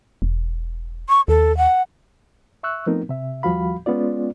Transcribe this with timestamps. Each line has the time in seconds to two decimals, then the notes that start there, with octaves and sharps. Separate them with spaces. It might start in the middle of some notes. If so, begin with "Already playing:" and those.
0.22 E1
1.09 C#6
1.28 D#2 A4
1.57 F#5
2.63 E5 C#6 E6 F#6
2.86 F3 A3 B3 C4 D#4 A#4
3.09 C3 E5
3.43 D#2 F3 G3 F#4 F5 B5
3.86 G#3 B3 C#4 F4 D5